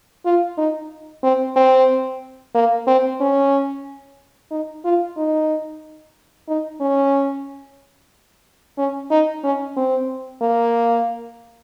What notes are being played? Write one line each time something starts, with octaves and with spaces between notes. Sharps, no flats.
F4
D#4
C4
C4
A#3
C4
C#4
D#4
F4
D#4
D#4
C#4
C#4
D#4
C#4
C4
A#3